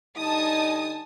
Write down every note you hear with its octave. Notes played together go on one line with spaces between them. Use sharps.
D3 G3 D#4 G#5 A5 D#6